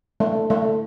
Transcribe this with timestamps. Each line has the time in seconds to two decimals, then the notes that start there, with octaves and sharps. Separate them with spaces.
0.20 A3
0.50 A3